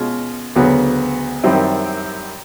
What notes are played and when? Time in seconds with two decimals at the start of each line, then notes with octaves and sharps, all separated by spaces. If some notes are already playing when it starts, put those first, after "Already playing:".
Already playing: B2 G#3 C#4 F4
0.56 D2 C#3 F#3 B3
1.43 F#2 D#3 G3 C4 E4